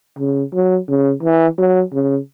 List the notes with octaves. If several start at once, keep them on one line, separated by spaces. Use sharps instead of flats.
C#3
F#3
C#3
E3
F#3
C#3